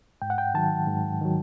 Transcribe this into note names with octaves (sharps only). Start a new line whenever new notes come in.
G#2 G5
F#5
G5
D#3 F#3 A5
G#2
D#3 F#3